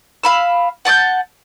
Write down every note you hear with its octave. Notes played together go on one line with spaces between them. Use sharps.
F5 B5 E6
F#5 A5 D6 G6